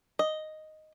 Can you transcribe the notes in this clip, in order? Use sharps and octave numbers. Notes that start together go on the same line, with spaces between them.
D#5